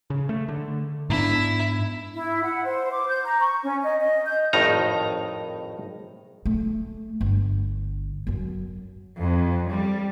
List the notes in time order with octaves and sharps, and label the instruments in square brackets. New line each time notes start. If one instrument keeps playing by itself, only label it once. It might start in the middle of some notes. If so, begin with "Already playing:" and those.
[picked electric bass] C#3
A3
D3
[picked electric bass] G#2 B3 D4 [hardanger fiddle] E4
[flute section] E4
F#5
C5
D6
G6
A#5
C#6
C#4
D#5
D#5
G6
[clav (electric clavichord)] G#1 F2 A2 D#3 D#4 A#5
[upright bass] A3
G1
F#2 F#3
[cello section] F2
G3